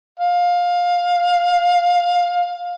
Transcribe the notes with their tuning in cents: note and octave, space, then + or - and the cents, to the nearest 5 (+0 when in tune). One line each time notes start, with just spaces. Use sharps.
F5 +15